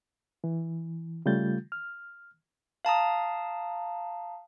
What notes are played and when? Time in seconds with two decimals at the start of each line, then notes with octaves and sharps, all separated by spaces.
0.44 E3
1.26 C#3 G3 A3 F4 G6 A6
1.72 F6
2.85 F5 A5 A#5 D#6